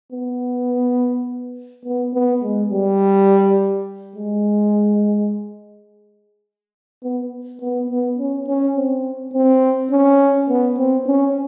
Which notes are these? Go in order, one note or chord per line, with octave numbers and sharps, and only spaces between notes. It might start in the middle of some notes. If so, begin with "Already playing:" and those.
B3
B3
B3
G#3
G3
G#3
B3
B3
B3
C#4
C#4
C4
C4
C#4
B3
C4
C#4